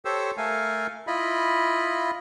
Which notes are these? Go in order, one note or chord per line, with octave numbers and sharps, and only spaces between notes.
G4 A4 C5 C#5 E6
A3 A4 A#4 F5 G#5
E4 F4 D#5 B5